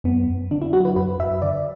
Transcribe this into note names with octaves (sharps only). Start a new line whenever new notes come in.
F#2 B3
F#2
D3 D4
E4
F#3 F#4
B4
F#2 B4
F#2 E5
D3 D5